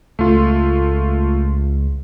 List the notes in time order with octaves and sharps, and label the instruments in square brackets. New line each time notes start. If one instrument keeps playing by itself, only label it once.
[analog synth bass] C#2 [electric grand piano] A3 F4